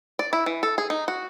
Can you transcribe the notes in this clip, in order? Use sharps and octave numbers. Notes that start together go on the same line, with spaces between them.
D5
E4
E3
A4
G#4
D#4
F#4